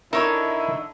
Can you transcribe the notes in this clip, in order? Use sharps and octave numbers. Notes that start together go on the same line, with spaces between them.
D3 D#4 E4 A#4 C#5 E5